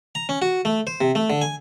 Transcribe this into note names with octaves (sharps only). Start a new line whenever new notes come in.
A#5
C#4
F#4
A3
C5
C3
A3
D3
G#5